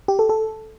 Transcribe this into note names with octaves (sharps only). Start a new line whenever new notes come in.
G4
A4
A4